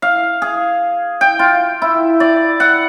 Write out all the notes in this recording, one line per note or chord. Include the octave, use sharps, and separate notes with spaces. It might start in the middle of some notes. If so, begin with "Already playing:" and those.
F5
G#4
G5
F4
E4
D5
F#5